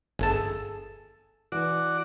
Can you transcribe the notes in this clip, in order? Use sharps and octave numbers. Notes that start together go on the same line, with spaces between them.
G1 G#4 A4 G#5 A5
E3 F#4 D5